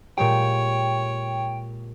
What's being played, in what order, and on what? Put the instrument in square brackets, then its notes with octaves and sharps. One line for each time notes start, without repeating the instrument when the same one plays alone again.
[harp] A#2 G#3 G4 [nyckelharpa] C#5 [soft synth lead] G5